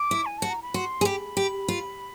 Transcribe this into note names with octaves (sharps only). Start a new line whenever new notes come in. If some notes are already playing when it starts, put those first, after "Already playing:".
Already playing: D6
E4
G#5
F#4 A5
A#5
B5
F#4 C6
G#4
G4 B5
G4
F4